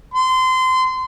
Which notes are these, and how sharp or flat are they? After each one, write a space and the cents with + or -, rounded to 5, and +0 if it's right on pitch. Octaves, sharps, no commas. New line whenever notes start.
C6 -25